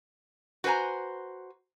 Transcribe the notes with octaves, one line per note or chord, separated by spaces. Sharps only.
F#4 B4 C5 G#5 A#5